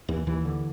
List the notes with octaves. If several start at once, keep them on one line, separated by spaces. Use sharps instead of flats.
D#2 E3
D#2 E3
D3